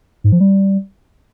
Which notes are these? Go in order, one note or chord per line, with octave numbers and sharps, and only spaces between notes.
G#2
F3
G3